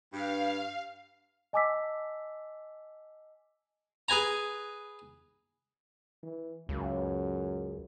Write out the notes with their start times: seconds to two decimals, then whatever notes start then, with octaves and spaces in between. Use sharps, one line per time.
0.13 G2 F5
1.53 D#5 G#5 A5 D6 E6 B6
4.08 G#4 B4 G#5 A#5
6.23 E3
6.69 C#2 F#2